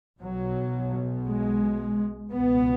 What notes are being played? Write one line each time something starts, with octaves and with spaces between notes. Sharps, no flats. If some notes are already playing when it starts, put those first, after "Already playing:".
B1 B2 F#3
G#3
C#2 B2 B3